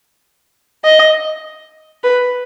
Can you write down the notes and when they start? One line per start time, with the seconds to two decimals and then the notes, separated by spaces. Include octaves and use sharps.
0.84 D#5
2.04 B4